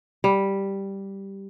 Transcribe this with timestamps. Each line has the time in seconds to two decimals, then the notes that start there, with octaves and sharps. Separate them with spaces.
0.24 G3